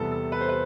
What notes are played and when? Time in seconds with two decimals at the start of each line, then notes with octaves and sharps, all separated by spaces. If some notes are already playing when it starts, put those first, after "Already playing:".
Already playing: E2 C3 G3 B3 A4
0.12 A4
0.32 B4
0.41 C5
0.49 B4